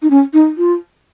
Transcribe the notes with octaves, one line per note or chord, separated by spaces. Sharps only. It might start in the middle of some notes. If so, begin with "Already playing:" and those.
D#4
C#4
D#4
F4